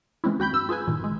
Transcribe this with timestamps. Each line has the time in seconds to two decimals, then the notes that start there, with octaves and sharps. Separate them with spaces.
0.24 E3 G#3 C4 C#4 E4
0.39 D#2 F#4 G5 B5 G6
0.53 G2 E6
0.69 F4 G#4 B4 G#5
0.87 G2 A#2 D#3
1.01 G1 G#3